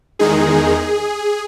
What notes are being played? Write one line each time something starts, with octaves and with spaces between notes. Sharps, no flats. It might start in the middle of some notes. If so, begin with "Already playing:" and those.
E2 D#3 G#3 D#4 G#4